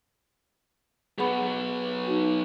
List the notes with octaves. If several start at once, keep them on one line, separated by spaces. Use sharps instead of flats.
F#3 B3 G#4 F#5 B5
D#4 F#4